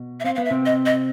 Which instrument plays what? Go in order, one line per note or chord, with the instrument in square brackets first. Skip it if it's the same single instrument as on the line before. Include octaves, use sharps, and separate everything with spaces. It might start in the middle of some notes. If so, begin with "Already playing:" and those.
Already playing: [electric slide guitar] B2
[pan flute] E5
[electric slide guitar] C4 [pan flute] F5
[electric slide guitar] B3 [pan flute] F5
[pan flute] E5
[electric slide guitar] C3 C4
[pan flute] D#5
D#5